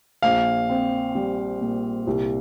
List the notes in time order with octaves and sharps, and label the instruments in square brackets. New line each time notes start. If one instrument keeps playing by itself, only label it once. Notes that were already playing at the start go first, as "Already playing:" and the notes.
[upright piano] A#1 [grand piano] F5
[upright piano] C4
G3
A#2
C2